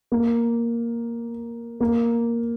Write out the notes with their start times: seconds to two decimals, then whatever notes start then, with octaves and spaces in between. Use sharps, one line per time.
0.12 A#3
1.80 A#3